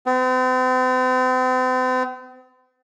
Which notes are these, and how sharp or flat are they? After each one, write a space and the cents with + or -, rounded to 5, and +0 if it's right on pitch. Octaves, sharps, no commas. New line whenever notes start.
C4 -40